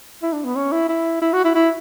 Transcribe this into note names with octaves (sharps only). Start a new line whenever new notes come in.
E4
D4
B3
C#4
E4
E4
E4
F#4
E4
E4